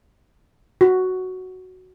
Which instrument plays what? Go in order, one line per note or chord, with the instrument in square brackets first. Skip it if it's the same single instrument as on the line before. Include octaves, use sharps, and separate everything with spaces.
[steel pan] F#4